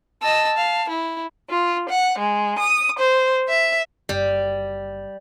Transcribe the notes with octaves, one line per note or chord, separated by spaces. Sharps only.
D#5 A5 E6
F5
E4
F4
F#5
G#3
D#6
C5
E5
F#1 G3